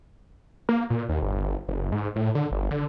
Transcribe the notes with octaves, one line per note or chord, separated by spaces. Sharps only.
A#3
A#2
D#2
G1
F#1
G#2
A2
D3
G1
D3